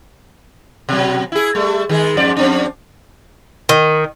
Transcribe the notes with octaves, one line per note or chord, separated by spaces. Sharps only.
B2 F#3
E4 G#4
G3 A3
D#3 G#3 G#4
F2 G#2 D5
F2 C4 D4
D#3